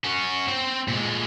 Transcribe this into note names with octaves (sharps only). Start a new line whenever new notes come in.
C#4 F#4
C4 C5
A#2 G#3